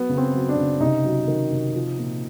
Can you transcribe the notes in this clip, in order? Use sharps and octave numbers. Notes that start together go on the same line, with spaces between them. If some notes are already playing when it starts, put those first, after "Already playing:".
Already playing: F#3 B3
C#3
C4
F#3
D4
C#3
C3 D#4
F#3
D#3
C3
F3
A#2